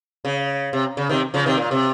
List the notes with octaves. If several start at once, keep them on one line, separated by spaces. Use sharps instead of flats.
C#3
C3
C#3
C3 D#3
C#3 F3
C3 D#3
A#2
C3